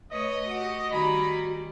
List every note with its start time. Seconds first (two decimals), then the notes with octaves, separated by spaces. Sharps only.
0.11 A3 B4 C#5 D#5
0.48 F#4 G4
0.91 D#3 G3 F#4 G#5 A#5 B5